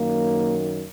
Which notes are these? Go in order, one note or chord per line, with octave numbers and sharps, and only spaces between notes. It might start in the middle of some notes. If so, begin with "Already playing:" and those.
Already playing: F#2 D#3 A#3